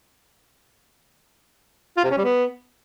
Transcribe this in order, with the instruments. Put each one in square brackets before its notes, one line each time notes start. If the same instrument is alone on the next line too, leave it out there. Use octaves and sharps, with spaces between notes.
[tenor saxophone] F4
C3
C#4
G3
B3